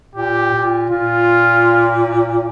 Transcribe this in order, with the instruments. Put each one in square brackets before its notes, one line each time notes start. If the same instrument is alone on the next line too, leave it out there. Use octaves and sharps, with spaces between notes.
[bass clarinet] A#2 [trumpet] G4
[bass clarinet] A#2
[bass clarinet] A#2 [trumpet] F4